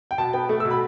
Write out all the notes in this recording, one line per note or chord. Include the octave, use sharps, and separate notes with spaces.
G5
B2 A5
B3 G5
A3
E6
B2
B5